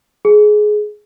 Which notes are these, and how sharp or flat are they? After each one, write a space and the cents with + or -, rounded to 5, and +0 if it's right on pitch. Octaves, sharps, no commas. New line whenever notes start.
G#4 +20